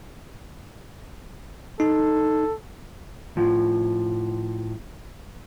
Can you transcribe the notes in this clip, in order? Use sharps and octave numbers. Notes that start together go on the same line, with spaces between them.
D#4 A4
A2 F3